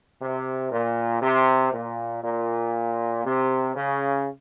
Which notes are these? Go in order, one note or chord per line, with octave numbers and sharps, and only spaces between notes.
C3
A#2
C3
A#2
A#2
C3
C#3